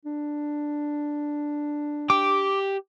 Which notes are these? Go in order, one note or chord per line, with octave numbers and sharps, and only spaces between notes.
D4
G4 D6